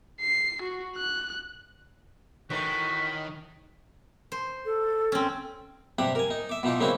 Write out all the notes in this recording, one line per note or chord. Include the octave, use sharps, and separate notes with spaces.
C7
F#4
F#6
A2 D#3 E3 F#4 B6
C5
A4
C4 C#4
G2 C3 G4 F#5
A#4 G#5
D#4
E5 D6
B2 E3 D#4 F4 D6
C#3 A#3 C4 D#4 E4 F#4